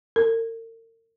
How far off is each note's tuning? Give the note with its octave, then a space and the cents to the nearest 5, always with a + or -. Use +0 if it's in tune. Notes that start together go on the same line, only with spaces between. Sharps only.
A#4 -45